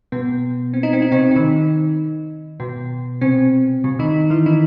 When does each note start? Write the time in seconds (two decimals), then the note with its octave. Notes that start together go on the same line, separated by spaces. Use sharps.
0.12 B2 B3
0.74 C4
0.83 D#4
0.93 C4
1.02 D#4
1.12 C3 C4
1.31 C4
1.35 D#3 D#4
2.60 B2 B3
3.21 C3 C4
3.84 C3 C4
3.99 D#3 D#4
4.30 E3 E4
4.46 D#3 D#4